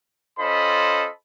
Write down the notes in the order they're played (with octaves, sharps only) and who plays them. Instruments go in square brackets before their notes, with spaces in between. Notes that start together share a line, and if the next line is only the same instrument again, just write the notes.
[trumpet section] C#4 F4 A4 C5 D#5 B5